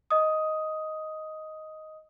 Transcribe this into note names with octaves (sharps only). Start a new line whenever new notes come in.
D#5 D#6